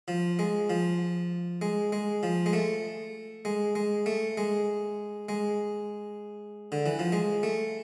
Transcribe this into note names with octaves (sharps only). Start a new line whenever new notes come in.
F3
G#3
F3
G#3
G#3
F3
G#3
A3
G#3
G#3
A3
G#3
G#3
D3
E3
F3
G#3
A3